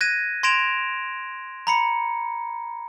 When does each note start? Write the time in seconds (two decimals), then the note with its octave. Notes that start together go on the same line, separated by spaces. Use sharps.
0.01 F#6 G#6 A#6 D#7
0.43 C6 G#6 A#6 D7 E7 F7
1.67 A#5 B5 C#7